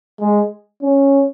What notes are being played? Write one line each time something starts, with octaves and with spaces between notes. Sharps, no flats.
G#3
C#4